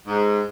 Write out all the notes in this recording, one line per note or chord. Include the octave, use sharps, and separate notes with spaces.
G#2